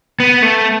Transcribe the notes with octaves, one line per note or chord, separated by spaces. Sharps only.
B3
A3